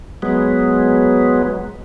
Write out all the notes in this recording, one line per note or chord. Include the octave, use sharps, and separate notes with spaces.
F#3 G#3 B3